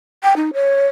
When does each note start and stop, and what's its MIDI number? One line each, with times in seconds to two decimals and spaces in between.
0.23 0.34 79
0.36 0.51 63
0.53 0.87 73